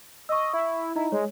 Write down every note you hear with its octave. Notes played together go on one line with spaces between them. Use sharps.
D#5 C#6 E6
E4
D#4 E4 D#5 A#5
G#3 C#5